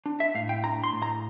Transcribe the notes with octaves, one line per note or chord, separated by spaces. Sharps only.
D4
E5
A2 F5
G5
D4 A#5
C6
A2
A#5